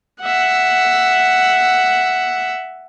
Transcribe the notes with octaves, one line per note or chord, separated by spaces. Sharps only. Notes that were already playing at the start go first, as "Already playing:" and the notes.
E5 F#5